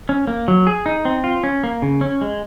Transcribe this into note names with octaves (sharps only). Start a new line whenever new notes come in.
C#4
A#3
F#3
G#4
D#4
C4
F4
C#4
A#3
C#3
C#4
G#3